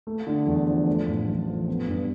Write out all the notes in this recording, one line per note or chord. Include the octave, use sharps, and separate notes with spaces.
A3
D3
E2
F3
A3
A2
A1
F3
B3
G2